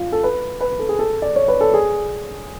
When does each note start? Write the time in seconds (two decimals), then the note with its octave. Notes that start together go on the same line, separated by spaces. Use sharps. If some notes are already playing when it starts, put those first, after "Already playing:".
Already playing: F4
0.12 A4
0.23 B4
0.61 B4
0.79 A4
0.89 G#4
0.99 A4
1.22 D5
1.36 C#5
1.48 B4
1.61 A4
1.74 G#4